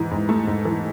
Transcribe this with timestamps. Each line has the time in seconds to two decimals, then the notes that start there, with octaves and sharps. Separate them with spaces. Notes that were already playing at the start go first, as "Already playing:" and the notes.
Already playing: G#2 E3
0.11 G#2
0.29 A3
0.47 G#2
0.65 E3